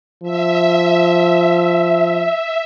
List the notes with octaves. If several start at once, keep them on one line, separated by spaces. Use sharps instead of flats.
F3 E5